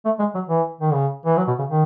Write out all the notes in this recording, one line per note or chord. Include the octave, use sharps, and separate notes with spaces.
A3
G#3
F#3
E3
D#3
C#3
E3
F#3
B2
C#3
D#3